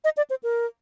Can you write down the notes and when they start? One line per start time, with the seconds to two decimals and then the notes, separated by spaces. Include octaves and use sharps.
0.04 D#5
0.17 D5
0.30 C5
0.43 A#4